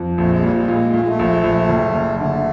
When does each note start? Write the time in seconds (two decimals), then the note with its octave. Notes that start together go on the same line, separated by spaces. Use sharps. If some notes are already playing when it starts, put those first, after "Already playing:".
Already playing: F2
0.18 A#1 A3
0.31 G#3
0.43 A#2 G3
0.56 G3
0.68 A#2 G#3
0.93 A#2 A3
1.01 G#3
1.09 A3
1.19 A#1
1.44 A#1
1.69 F#1
1.95 F#1
2.20 D3 A3